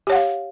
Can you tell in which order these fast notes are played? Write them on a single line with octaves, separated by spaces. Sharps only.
G4 C#5 F#5 F5